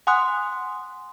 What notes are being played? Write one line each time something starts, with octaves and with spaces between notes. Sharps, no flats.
F#5 G#5 C6 D#6 F#6